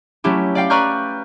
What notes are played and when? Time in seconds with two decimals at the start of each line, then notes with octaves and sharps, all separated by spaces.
0.24 F#3 A3 C#4 E4 G4
0.55 D5 F5 G5
0.70 B4 D5 A#5 C#6 F6 G6